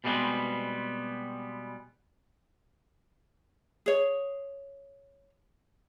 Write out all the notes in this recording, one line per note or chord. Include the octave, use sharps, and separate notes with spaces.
B2 G3 G#3 B3 C4
G#4 C#5